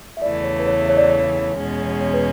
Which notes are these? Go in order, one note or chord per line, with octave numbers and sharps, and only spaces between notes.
E5
E2 C#3 E3 A3 D5
C#5
B4
C#5
C#5
D5
C#5
E2 B2 G#3 C#4
B4